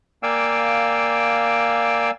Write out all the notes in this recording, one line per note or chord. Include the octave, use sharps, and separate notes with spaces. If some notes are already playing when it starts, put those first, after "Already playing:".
A#3 D5 F5 G5 G#5 E6